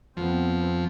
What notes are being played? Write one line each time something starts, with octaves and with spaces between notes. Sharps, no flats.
F2 F3 B3 C4